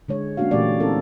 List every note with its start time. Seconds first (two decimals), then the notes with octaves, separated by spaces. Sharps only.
0.08 D3 G#3 C#5
0.37 G#3 A#3 C#4 D4 F#4 F5
0.51 A#2 E3 A3 A#3 G4 D5
0.80 C4 C#4 D#4 A4 A#4